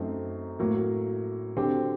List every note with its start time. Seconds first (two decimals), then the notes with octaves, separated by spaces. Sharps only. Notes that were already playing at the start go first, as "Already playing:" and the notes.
Already playing: F#2 F#3 A3 C4 D#4
0.59 A2 F#3 A#3
1.57 D3 F#3 C4 G4